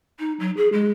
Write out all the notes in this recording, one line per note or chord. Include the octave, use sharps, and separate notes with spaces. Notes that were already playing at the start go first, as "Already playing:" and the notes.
D#4
F#3
G#4
G#3